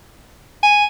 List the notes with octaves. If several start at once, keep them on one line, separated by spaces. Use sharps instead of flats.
G#5